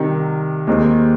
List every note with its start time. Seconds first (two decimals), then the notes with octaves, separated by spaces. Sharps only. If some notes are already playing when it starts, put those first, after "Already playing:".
Already playing: C2 C3 D#3
0.67 D#2 D#3 G#3 C4